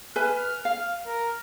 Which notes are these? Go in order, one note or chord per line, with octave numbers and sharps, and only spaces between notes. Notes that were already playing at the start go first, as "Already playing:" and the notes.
B4 E5 G#5 F6
F5
A#4